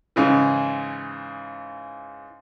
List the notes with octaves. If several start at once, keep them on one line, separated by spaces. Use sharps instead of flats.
G#2 C#3 E3